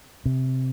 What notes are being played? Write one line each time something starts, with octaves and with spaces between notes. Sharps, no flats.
C3